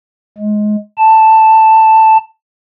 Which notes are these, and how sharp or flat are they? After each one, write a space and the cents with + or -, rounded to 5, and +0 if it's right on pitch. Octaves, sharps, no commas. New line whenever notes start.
G#3 +20
A5 +5